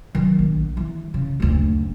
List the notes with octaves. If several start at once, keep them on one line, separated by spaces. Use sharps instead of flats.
D#3 F#3
A#1
E3
C#3
F#1 D2